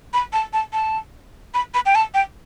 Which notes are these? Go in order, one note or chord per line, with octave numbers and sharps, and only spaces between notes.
B5
A5
A5
A5
B5
B5
G5
A5
G5